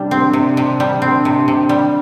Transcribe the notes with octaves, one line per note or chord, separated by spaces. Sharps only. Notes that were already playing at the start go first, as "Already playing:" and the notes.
Already playing: C3 G3 D4
C4
C3
C3
G3
C4
C3
C3
G3